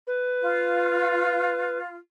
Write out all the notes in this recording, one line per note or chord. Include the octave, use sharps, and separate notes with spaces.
B4
F4